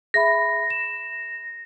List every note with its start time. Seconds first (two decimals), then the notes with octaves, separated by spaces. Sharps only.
0.14 G#4 E5 B5 A#6
0.70 E7